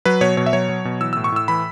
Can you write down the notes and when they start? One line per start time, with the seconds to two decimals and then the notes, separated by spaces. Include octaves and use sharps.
0.05 F#3 B4
0.21 B2 C#5
0.37 B2 C#5
0.46 E5
0.53 F#3 C#5
0.69 F#3
0.85 B2
1.01 E3 E6
1.13 A2 E6
1.24 C#6
1.32 A2 E6
1.48 E3 B5